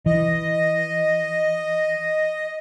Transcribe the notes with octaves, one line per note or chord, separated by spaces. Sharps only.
E3 D#5